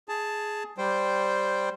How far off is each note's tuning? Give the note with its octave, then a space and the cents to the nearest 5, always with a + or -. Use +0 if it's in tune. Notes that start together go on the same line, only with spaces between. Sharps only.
G#4 +10 A5 +0
G3 +0 C5 +0 G5 -5